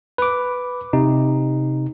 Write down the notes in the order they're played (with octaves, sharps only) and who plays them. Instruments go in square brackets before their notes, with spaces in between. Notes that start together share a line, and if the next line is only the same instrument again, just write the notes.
[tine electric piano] B4 D6
C3 D#4